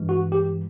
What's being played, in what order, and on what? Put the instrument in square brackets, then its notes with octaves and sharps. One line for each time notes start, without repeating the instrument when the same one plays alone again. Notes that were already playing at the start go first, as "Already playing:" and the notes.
Already playing: [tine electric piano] G2 E3 G#3
F#4
G4